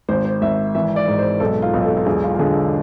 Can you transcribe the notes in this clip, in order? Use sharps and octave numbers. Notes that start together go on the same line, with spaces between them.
G#1 C5
C5
G#1 E5
E3 E5
D5
G#2
C5
B1 A4
F4
B1
A4
F4
E1 G#4
F4
F4
D3 G#4